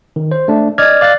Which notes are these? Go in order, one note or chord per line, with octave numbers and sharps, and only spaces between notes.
D#3
C5
A3 D4
D5 D#5 F6 G#6
D5 F5 F#6 A6